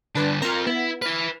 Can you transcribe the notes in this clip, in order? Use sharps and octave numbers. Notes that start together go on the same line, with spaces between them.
D3 G3 D4 B4 D5
C4 F4 A#4 A#5
B3 E4
E4 B4 F6